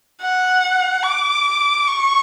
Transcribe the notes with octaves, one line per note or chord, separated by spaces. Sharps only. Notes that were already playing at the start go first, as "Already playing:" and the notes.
F#5
D6
C#6